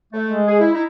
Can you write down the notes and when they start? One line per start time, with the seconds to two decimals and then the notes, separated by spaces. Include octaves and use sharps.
0.13 A3
0.27 G#3
0.47 G#4
0.60 E4
0.74 D#4 E4